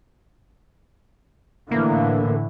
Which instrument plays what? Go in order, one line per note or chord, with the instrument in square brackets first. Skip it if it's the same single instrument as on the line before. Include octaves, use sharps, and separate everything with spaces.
[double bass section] A2 D3 E3 [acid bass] A#3